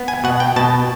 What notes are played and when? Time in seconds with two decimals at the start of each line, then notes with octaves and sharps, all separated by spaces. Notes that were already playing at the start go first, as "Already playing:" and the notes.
Already playing: B3
0.08 G#5
0.24 B2 F#5
0.40 G5
0.56 B2 A5